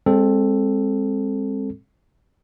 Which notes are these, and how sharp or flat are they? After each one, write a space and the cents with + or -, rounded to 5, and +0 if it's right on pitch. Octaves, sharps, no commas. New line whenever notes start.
G#3 -35 C4 +15 A4 +0